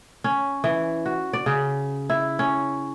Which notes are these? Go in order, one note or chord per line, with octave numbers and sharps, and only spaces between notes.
C#4
E3
F#4
D5
C#3
E4
C#4